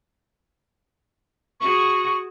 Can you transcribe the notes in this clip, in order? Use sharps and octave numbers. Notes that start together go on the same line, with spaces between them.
F#4 G#4 C#6